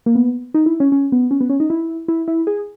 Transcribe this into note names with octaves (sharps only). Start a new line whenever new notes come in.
A#3
B3
D#4
E4
C#4
C#4
B3
C#4
B3
C#4
D#4
E4
E4
E4
G#4